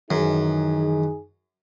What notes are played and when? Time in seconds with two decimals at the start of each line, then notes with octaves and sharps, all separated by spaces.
0.11 F#2 D#3 E3 D#4 G#4 B4